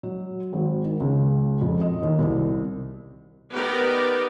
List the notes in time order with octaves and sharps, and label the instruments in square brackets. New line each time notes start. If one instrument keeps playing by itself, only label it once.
[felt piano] F#3
G#1
D#3
C#2
F2
D#5
D#2
C2
[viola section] B3 D#4 G4 A#4 B4 D5